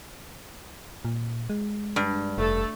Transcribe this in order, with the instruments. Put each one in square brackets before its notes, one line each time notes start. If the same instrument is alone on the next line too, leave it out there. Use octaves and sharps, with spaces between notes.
[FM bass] A#2
G#3
[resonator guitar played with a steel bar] G2
[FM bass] F1 [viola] A3 A4